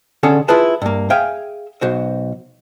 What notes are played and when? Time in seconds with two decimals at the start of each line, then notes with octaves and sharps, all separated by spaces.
0.23 D3 C#4 G#4 A4 C#5
0.48 E4 F4 G#4 B4 A5
0.82 G2 A#3
1.10 G#4 E5 F5 G5 G#5
1.81 B1 F#4 C5